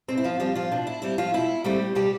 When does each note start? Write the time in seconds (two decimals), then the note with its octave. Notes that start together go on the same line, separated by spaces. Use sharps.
0.08 B2 C4 C5
0.17 E4
0.24 F3 F4
0.40 F3 G3 C4 F4
0.56 F3 F4
0.71 B2 D4
0.87 E4
1.02 G3 C4 E4
1.18 F3 F4
1.34 B2 E4
1.64 G3 A3 C4 G4
1.95 B2 G3 G4